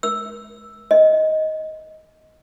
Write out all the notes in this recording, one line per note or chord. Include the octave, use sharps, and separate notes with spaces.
E6
D#5